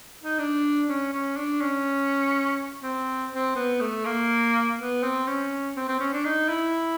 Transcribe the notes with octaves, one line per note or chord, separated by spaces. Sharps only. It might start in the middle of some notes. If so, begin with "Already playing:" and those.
D#4
D4
C#4
C#4
D4
C#4
C4
C4
B3
A3
A#3
B3
C4
C#4
C4
C4
C#4
D4
D#4
E4